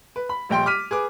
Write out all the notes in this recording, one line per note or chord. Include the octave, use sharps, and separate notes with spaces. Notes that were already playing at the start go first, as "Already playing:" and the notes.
B4
B5
D#1 A#1 G5 C6
D6 F6 B6 D#7
G#4 B4 D6